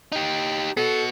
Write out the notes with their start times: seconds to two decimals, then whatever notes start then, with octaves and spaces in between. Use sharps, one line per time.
0.12 D#4 G4
0.77 B3 F#4 A4